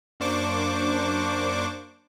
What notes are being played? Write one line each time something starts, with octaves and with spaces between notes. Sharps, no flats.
F#2 A#3 D4 C5 C#6 D6